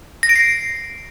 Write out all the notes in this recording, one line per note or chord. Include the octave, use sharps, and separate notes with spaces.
A#6
D7
C7